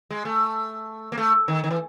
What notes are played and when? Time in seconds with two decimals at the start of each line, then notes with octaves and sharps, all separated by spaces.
0.10 G#3
0.25 A3
1.12 A#3
1.18 A3
1.48 D#3
1.64 D#3
1.71 E3